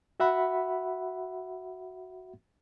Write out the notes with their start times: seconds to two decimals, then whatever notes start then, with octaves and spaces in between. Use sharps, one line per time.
0.20 F#4 E5 F#5 B5